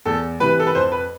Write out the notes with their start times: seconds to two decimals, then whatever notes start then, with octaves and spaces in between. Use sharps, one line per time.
0.05 E2 A4
0.40 C3 E3 B4
0.60 A4
0.67 B4
0.75 F2 C5
0.92 B4